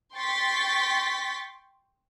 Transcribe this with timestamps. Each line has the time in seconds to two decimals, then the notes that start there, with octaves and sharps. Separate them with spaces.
0.15 G5 C6 C#6 A6 B6